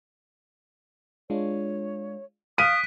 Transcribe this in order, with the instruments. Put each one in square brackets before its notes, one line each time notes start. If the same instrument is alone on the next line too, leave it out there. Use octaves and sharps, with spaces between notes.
[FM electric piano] G#3 D4 F4 [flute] C#5
[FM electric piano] F5 F6 [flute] D#6 [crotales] F#6 B6 D7 [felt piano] D#7